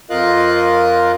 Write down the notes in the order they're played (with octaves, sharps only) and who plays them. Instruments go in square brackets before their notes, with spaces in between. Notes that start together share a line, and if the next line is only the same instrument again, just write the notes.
[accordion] F2 F4 A#4 D#5 F5 F#6